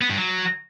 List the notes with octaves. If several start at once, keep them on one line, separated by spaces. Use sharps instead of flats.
B3
G2
F#3